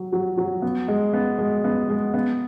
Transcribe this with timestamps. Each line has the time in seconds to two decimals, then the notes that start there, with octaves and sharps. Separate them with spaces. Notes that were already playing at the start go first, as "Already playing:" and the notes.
Already playing: F#3
0.13 F#3
0.38 F#3
0.62 B3
0.88 G#3
1.14 B3
1.39 G#3
1.64 B3
1.89 G#3
2.14 B3